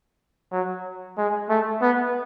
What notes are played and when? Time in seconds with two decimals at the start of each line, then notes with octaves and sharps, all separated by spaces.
0.52 F#3
1.18 G#3
1.49 A3
1.82 B3